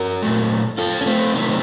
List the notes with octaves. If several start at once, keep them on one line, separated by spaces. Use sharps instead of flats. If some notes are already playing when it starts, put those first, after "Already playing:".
Already playing: F#4 A#4
A#2 F#3 A3
F4 A4
C#4
A3 C4
C3 D#3 F#3 A3